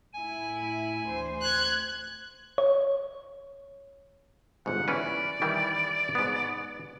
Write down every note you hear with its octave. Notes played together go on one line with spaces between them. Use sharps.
A2 E4 G#5
D2 E3 C5
F#6 G#6
C#5
G1 G#2 F#5
E3 C#4 B4 D5
D#3 E3 G3
G#2 B3